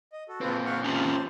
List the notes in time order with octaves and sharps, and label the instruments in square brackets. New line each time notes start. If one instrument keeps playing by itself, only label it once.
[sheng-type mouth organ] D#5
F#4 A4
[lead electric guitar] A#2 C4 [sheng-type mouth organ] F4 A4 B4
[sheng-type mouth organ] F5 F#5 C#6
[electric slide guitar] C#4 F4 G4 [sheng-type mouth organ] C5 A5